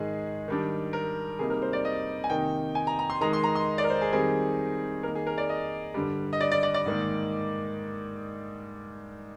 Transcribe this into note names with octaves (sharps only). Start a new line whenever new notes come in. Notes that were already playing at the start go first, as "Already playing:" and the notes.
Already playing: G#2 D#3 G#3 G#4
D#3 G3 D4
A#4
C3 G3 A#3 D#4 G#4
A#4
C5
D5
D#5
G#5
C3 D#3 A#3 D#4 G5
G#5
A#5
A#5
C6
D#3 G#3 D#4 A#5
C6
A#5
C6
D5
A#4
C5
G#4
D#3 G3 C4 D#4 G#4
D#3 A#3 D#4 A#4
G#4
A#4
D5
D#5
G2 D3 G3
D#5
D5
D5
D5
D5
G#2 D#3 A#3